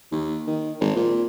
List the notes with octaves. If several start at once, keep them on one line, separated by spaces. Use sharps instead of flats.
D#2
D#3
G#1
A#2